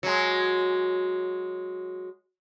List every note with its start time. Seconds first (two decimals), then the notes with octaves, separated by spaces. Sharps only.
0.03 F#3 G#3